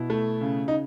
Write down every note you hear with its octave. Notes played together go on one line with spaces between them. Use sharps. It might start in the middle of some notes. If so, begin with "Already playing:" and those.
Already playing: B2 E4
A3
C#3
D#4